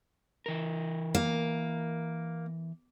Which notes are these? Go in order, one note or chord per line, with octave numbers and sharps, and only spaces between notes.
E3 A#4
A#3